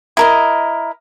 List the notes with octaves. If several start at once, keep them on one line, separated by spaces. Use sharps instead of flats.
E4 A#4 D#5